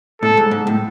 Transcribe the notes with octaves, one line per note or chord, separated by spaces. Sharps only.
A2 A4
G#2
G#2
A2